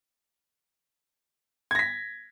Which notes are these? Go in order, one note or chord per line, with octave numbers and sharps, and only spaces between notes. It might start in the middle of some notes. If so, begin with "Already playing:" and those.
G#6 A#6 B6